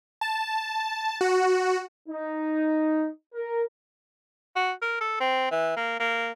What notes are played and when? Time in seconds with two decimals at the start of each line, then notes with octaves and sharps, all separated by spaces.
0.21 A5
1.21 F#4
2.09 D#4
3.34 A#4
4.56 F#4
4.82 A#4
5.01 A4
5.20 C4
5.51 E3
5.76 A#3
6.00 A#3